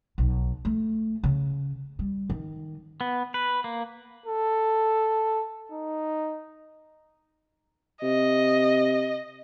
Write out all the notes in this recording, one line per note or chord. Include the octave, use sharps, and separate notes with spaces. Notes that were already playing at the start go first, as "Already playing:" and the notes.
B1
A3
C#3
G3
D#3
B3
B4
A#3
A4
D#4
C3 D#5